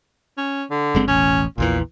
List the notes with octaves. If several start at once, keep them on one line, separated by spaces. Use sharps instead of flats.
C#4
D3
F#1 G#3 C4
E1 A1 C#4
A#1 E2 A#2 E3